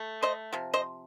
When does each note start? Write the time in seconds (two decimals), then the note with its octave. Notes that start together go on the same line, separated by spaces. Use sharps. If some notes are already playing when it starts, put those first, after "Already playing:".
Already playing: A3
0.22 C5 D#5
0.53 C3 F3
0.74 C5 D#5